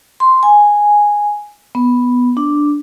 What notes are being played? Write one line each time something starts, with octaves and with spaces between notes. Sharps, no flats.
C6
G#5
B3
D4